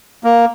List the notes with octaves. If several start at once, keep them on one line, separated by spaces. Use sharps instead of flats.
A#3